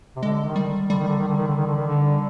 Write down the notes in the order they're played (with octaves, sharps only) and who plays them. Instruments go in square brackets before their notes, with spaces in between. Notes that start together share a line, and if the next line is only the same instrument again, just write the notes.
[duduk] C3
[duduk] D3 [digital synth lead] G#3
[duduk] D#3
[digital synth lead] G3
[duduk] D3 [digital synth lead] G3
[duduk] D#3
D3
D#3
D3
D#3
D3
D#3
D3
D#3
D3